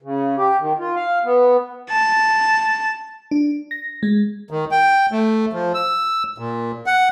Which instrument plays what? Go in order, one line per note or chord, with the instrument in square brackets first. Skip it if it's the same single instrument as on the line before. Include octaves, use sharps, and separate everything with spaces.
[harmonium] C#3
G4
D#3
F4
F5
B3
[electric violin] A5
[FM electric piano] D4
A#6
G#3
[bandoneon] D#3
G5
A3
F3
E6
A#2
F#5